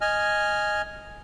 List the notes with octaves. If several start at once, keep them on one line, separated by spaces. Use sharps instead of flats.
D#5 G#5 F6